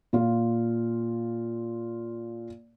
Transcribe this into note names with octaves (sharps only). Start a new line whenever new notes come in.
A#2 F4